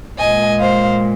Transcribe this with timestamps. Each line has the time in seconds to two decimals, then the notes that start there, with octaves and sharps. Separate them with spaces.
0.18 A#2 G#3 D#5 G#5
0.59 C5 F5